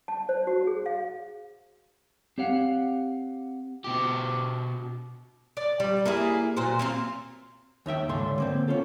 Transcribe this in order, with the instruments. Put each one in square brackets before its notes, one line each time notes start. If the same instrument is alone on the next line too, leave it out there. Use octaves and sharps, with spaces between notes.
[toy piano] A5
C5
F#4
G#4
F5
[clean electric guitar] C4 G4 C#5 F5 F#5
[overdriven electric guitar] B2 G4
[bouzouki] D5
G3
A#3 E4 G#4
A#2 F#3 C5
A#3 C4 F4
[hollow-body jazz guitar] D#2 D#4 E5 G5
C#2 G#2 D3 D4 C6
D3 A#3 C4
C#4 F4 A4